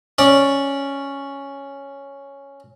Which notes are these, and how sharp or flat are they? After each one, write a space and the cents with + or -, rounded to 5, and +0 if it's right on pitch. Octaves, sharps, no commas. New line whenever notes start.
C#4 +0 D5 +0